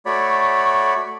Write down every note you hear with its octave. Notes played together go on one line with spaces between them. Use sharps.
A3 F#4 C#5 D5 B5